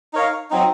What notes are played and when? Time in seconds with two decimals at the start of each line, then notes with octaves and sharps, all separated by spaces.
0.13 D#4 A#4 C#5 F5
0.50 F#3 C4 D#4